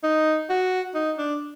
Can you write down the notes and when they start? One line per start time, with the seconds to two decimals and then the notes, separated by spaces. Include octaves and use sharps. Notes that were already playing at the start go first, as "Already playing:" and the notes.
0.03 D#4
0.50 F#4
0.95 D#4
1.18 D4